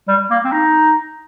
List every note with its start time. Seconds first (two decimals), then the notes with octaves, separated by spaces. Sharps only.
0.08 G3
0.31 A#3
0.45 C4
0.52 D#4